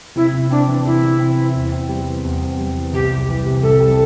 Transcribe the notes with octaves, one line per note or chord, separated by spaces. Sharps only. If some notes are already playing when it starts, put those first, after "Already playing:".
C3 E4
C3
C4 D4
E3
C3 E4
C3
C4
E3
E2
C4
G3
E3
E2
C4
G3
E3
C2 G4
G3
E3
C3
C2 A4
G3